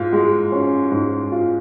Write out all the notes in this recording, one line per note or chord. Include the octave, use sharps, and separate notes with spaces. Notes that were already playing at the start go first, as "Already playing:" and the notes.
Already playing: G#2 F4
G#3
C#4
G#2
F4